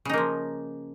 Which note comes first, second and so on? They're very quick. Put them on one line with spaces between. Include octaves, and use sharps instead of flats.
C#3 D#4 A#3 F3